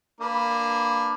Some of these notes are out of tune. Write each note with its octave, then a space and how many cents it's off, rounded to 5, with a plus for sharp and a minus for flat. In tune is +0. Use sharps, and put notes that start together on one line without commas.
A#3 +0 D4 +15 B4 +0